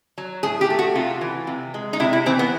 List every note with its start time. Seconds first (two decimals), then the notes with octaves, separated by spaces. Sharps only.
0.18 F#3
0.43 A2 G#4
0.61 G4
0.70 A3
0.79 F#4
0.95 C3 F4
1.21 E3
1.47 C3
1.74 G#3
1.93 D#4
2.00 C3 E4
2.13 E4
2.26 E3 C4
2.39 B3